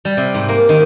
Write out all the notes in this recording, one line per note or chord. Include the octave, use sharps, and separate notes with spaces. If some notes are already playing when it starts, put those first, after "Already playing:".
G3
C3
G#2
A#3
D#3